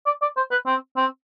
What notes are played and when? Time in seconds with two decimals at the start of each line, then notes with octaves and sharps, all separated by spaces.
0.06 D5
0.22 D5
0.37 C5
0.51 B4
0.66 C4
0.97 C4